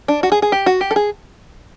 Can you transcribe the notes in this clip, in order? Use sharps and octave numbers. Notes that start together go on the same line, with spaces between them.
D4
F#4
G#4
G#4
G4
F#4
G4
A4
G#4